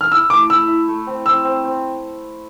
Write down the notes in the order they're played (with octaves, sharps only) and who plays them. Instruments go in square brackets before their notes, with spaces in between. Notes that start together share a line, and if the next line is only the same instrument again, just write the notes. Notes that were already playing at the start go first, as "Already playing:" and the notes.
[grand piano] F6
[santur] E4 [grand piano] E6
[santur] A3 [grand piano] D6
[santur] E4 [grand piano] E6
[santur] E4
A3
C4
[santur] C4 [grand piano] E6
[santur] C4
C4